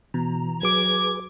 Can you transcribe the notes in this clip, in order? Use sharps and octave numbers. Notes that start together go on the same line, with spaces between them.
B2 E3 A#5
F#3 G#4 B4 D6 G#6